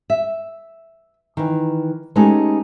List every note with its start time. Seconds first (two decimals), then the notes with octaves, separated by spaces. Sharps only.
0.10 E5
1.37 D#3 E3
2.16 G#3 A3 B3 C#4 D#4 G4